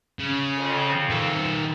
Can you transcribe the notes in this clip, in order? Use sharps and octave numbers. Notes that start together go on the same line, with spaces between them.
C#3
F2
D#3 E5